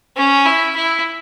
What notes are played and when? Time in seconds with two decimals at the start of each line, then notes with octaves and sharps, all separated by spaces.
0.17 C#4
0.46 E4
0.76 E4